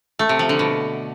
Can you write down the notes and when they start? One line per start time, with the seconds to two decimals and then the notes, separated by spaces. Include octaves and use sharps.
0.19 A3
0.29 C3
0.39 F3
0.49 D3
0.59 B2